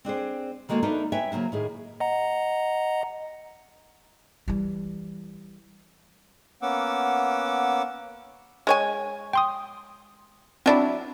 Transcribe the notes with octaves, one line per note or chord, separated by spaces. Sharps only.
C4 D4 G#4 C5
D#3 G#3 A#3 F#4 A4
A3 B3 D4 D#4 A#4 B4
B4 C#5 E5 G5 G#5
C#3 F#3 A#3 C5
A2 D#3 G#4
D#5 F#5 A#5
E3 G3
A#3 B3 C#4 F#5 D6 E6
G#3 C#5 G#5
G5 C6 D#6
F#3 C4 D4 E4 D5